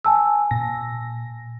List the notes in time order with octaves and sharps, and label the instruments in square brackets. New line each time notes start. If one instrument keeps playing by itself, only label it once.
[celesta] G#5 A5 E6
[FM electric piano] A#2 A#6